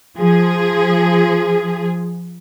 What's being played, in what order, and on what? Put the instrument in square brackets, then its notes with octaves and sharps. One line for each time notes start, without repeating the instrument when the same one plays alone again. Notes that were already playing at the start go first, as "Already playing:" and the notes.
[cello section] F3 G#4